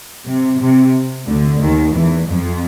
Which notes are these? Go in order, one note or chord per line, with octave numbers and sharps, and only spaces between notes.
C3
C3
D2 D3
D#2 D#3
E2 E3
F2 F3